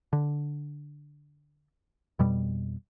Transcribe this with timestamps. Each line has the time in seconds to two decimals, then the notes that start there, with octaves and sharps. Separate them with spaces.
0.13 D3
2.19 F2 B2 G3